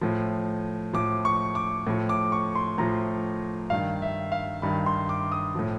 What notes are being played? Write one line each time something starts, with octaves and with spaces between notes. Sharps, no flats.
A2 F3
A2 F3 D6
C#6
D6
A2 F3
D6
C#6
C6
A2 F3 A#5
G2 D#3 F5
E5
F5
G2 D#3 B5
C6
D6
D#6
A2 F3